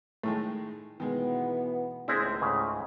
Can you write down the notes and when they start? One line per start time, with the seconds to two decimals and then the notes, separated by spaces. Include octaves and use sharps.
0.23 A2 D#3 G#3 A3
1.00 B2 D#3 E3 G#3 B3
2.08 C#2 A2 G#3 C4 D4 E4 G#4 C5
2.42 G#2 C#3